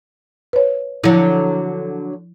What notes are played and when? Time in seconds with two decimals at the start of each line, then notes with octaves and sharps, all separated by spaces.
0.53 B4 C#5
1.04 D3 F3 F#3 E4